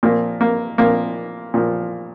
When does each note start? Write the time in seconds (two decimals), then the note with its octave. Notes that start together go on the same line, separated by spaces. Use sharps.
0.03 A#2 F3 A#3
0.41 A#3
0.78 A#2 F3 A#3
1.54 A#2 F3